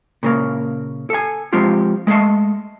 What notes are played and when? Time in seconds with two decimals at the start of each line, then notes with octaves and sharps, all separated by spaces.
0.23 A#2 C#3 A#3
1.10 A4 G#5
1.53 F3 G#3 C4 F4 G4
2.07 G#3 A3 D#5 F5 A5